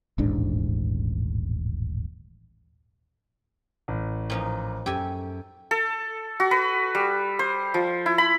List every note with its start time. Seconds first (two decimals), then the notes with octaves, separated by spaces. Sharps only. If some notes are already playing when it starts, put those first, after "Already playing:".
0.18 D#1 A1 G#2 D4
3.88 A1
4.30 A#2 F3 D#4
4.86 F#2 G4 A4 G#5
5.71 A4
6.40 F#4
6.51 B4
6.95 G3
7.39 C5
7.74 F3
8.06 E4
8.18 B5